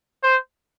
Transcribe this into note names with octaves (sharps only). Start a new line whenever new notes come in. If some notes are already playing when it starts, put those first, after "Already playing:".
C5